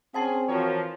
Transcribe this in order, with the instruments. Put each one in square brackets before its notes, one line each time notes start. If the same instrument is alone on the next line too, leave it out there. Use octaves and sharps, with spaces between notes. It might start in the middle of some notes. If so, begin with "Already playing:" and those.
[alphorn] C4 [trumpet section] C#4 G#4 [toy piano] F#5 A5 C6
[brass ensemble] E3 F3 [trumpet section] F#4 A#4 C#5